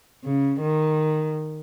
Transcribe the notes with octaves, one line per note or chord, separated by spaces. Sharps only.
C#3
D#3